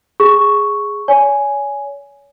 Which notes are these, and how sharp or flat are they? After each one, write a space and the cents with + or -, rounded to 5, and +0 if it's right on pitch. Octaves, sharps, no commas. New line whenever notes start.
G#4 -5 C#6 +0
C#5 +35 G#5 +5